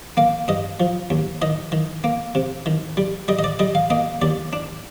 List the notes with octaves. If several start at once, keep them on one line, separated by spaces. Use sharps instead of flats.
A#3 F5
G2 D#5
F3
D#2
D#3 D#5
D#3
A#3
C3
D#3
G3
G3 D#5
D#5
D5
G3 D#5
F5
A#3 D#5
D#2 D5
D4